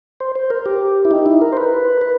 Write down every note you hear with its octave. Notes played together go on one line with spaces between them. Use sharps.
C5
C5
A#4
G4
E4
D#4
E4
A#4
C5
B4
B4